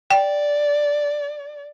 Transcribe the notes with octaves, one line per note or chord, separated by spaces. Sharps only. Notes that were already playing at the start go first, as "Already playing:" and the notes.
D5 G5